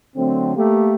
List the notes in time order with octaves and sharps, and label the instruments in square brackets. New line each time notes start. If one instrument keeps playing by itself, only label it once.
[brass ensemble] D3 F#3 A3 C4
A3 A#3 G4